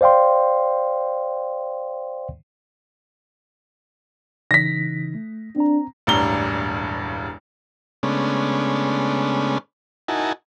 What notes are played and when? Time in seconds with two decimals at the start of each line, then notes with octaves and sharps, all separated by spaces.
0.01 C5 D5 F5 G5 C6
4.51 C#3 E3 D#4 A#6 B6
5.15 A3
5.56 C4 D4 A#5
6.07 E1 A1 G2 D4 A#5 G7
8.03 C#3 G#3 A3 B3 C#4 D4
10.08 D#4 E4 F#4 A#4 G#5 A5